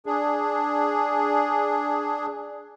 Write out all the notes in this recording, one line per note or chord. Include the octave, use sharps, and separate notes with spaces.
D4 G#4